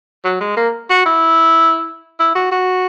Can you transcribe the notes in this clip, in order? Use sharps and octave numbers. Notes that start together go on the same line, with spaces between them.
F#3
G#3
A#3
F#4
E4
E4
F#4
F#4